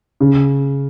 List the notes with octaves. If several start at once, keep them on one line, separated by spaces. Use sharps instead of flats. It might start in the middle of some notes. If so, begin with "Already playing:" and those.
C#3